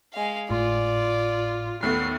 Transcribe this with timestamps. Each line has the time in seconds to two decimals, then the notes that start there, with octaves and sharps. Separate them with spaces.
0.13 G#3 F5
0.50 G#1 A2 F4 D5 C6
1.83 D#2 A3 B3 B5 C7